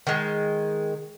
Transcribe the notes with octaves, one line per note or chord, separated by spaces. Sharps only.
D#3 G#3